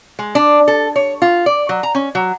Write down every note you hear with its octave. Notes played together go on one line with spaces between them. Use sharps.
G#3
D4
A4
C#5
F4
D5
F#3
A#5
C#4
F#3